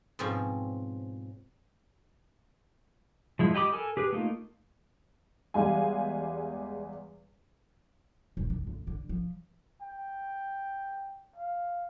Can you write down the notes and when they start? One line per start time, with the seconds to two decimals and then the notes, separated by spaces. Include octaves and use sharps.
0.19 G#2 B2 F3 C4 C#4
3.39 F3 G#3 E4
3.54 G4 D#5 B5 D6 D#6
3.72 A4 A#4 G#5
3.97 G4 G#4 B4
4.13 A3 A#3 D#4 F4
5.54 E2 G3 G#3 F5 G#5
8.37 E1
8.50 D#3
8.67 A2 E3
8.87 D3
9.09 F3
9.82 G5
11.36 F5